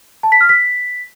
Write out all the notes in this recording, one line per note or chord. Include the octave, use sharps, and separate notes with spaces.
A5
B6
F6
B6